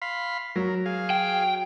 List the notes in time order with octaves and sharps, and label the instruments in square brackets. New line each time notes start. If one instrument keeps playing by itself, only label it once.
[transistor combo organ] F5 B5 C6
[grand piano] F#3 [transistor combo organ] A#4
[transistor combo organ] G#4 F5
[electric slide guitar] G5